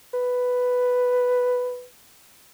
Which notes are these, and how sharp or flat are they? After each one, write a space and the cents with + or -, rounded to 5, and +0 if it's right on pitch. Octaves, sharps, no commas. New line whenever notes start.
B4 +5